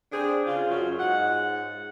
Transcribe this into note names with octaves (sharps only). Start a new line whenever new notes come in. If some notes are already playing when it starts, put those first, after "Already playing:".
C4 D4 G#4 C5 D5
C#3 F4
F#2 F#3 C#4 F4
G#2 G#3 F#5